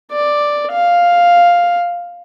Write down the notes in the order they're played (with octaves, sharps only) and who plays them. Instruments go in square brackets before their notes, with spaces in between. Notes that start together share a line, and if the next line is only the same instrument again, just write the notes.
[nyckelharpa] D5
F5